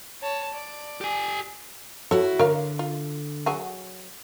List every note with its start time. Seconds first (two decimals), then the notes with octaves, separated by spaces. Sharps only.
0.22 C#5 A5
0.55 D5
1.01 G4 G#5
2.11 E4 F#4 A4 C#5
2.39 D3 A#4 C#5 F5
2.79 F4
3.46 F#3 F#4 G#4